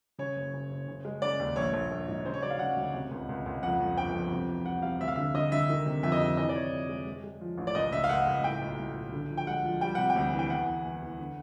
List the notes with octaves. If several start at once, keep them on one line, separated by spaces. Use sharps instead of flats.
C#3 C#5
F#1
C#3
F#1
C#3
G#3
C#3 D5
D#2
A#1 C#5
A#1
A#1
G#2
C#3 C5
C#5
F#3 D5
F5
C#3 F#5
D2
C3
C#2
C#2
C#2
F2 F#5
F2
G1 G5
F2
C3
E2
C3 F#5
C3 F5
D2 E5
F5
D3 E5
D3 D#5
D3 E5
D#3
C3
F2 E5
D#5
C3 E5
E3 D#5
D5
E3 C#5
F2
G#3
G#3
G#3
F3
A1
D5
C#2 D#5
C#2 E5
F5
C#2 F#5
C#2
A2 G5
B1
A2
B1
D3
F3
G5
G#3 F#5
F3
G3 G5
C3 F#5
G5
D2
E3
G5
E2 F#5
E2
E2
E2
D3